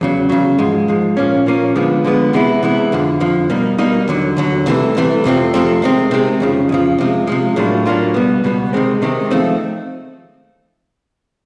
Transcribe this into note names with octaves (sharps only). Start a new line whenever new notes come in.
E2 C#3 F#3
E2 C#3 F#3
G#2 F3 G#3
G#2 F3 G#3
A#2 F3 A#3 C#4
A#2 F3 A#3 C#4
D3 F3 G#3 B3
D3 F3 G#3 B3
C3 E3 G#3 B3 E4
C3 E3 G#3 B3 E4
F2 D3 F3
F2 D3 F3
B2 G3 A#3 D#4
B2 G3 A#3 D#4
D#2 D3 F#3
D#2 D3 F#3
C2 C3 E3 A3
C2 C3 E3 A3
F2 C3 F3 A3 C4
F2 C3 F3 A3 C4
C3 D#3 G#3 C4
C3 D#3 G#3 C4
F2 C#3 F3
F2 C#3 F3
C3 F3 G#3
C3 F3 G#3
A2 F#3 A#3 D4 F4
A2 F#3 A#3 D4 F4
C#2 B2 G3 B3
C#2 B2 G3 B3
C3 D#3 G#3 C4
C3 D#3 G#3 C4
F3 A3 C4 D#4